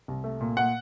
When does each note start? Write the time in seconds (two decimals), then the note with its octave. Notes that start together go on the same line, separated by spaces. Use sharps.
0.08 C2
0.24 A3
0.41 A#2
0.57 A#2 F#5